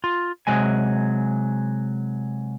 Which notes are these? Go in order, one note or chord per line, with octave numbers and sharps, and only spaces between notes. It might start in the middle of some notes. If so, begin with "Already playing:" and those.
F4
C3 F#3 G#3 G#5